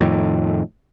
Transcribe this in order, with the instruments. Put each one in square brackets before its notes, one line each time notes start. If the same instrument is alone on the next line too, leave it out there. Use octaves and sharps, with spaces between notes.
[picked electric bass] F2 A2 D#3